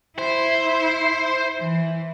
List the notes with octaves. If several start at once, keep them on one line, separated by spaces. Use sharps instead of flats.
E4 C5
E3